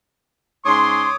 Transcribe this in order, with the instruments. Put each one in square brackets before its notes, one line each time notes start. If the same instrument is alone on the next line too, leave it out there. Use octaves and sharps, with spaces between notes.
[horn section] G#2 C#4 C6 [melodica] C#5 D6 D#6